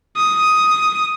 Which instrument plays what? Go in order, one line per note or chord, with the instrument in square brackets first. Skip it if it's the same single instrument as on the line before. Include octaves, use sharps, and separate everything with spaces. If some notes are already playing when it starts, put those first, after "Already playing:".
[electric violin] D#6